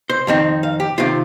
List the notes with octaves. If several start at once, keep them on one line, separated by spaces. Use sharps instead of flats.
C5
F2 D#3 C4 D#4
F5
G4
C3 D#3 C4 F4